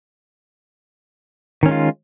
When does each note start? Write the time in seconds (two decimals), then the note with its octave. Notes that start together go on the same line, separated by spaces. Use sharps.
1.63 D#3
1.66 C#4
1.69 G#3
1.71 F4